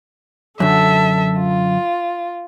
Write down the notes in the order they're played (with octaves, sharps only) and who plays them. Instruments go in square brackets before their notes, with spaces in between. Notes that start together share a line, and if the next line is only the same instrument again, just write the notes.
[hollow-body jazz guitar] F#2 D3 [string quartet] A4 E5 A5
[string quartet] F4